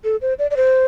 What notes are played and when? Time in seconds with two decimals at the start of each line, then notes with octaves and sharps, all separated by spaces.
0.04 A4
0.22 C5
0.39 D5
0.51 D5
0.57 C5